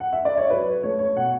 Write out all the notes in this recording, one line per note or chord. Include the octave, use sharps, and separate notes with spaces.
F#5
E5
D5
C#5
F#3 B4
A3 C#5
C#5
B2 F#5